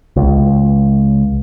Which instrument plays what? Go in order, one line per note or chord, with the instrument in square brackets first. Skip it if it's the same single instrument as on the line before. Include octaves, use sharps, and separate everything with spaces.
[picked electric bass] C#2